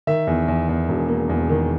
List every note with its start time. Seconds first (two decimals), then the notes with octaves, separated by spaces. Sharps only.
0.07 D#3 E5
0.27 E2
0.48 E2
0.69 E2
0.89 E1
1.08 A#3
1.29 E2
1.49 D#3